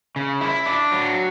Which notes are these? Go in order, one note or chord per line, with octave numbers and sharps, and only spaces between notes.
C#3
E4
D4
F#3